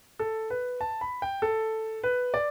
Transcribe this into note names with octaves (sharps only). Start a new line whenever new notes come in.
A4
B4
A5
B5
G5
A4
B4
D5